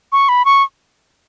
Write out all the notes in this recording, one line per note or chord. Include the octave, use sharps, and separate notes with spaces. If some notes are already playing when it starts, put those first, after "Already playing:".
C#6
B5
C#6